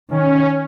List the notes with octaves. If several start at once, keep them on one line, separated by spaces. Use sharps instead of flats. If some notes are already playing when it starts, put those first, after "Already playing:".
D#3 C#4